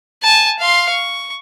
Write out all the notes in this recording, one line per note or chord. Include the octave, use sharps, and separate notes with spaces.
G#5 A5
F5 C6
C#6